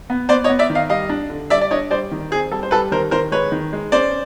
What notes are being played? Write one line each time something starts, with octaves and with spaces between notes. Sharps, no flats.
B3
B3 C5 D5
C#5 D#5
B3
D5 E5
D#3
D#5 F5
G3 D#5 F5
D4
D3
G3 D5 E5
D5
D4 C#5 D#5
G3 C5 D5
D#3
C4 G#4
G3 A4
C5
G3 A4 B4
D#3 A#4 C5
D#3 A#4 C5
G#3 B4 C#5
D#3
G#3
C#4 C5 D5